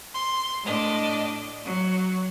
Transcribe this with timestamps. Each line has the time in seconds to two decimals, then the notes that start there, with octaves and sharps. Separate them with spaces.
0.14 C6
0.64 A2 D4 D#5
1.65 F#3